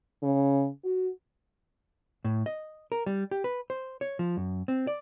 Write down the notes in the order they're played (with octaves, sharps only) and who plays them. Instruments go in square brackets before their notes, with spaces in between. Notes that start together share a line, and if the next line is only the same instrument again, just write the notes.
[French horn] C#3
F#4
[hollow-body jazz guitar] A2
D#5
A#4
G3
G4
B4
C5
C#5
F3
F#2
C4
D5